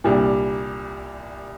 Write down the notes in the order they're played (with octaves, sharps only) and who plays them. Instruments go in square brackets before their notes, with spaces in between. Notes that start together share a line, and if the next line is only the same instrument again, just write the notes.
[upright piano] C2 A#2 G3 D4 G4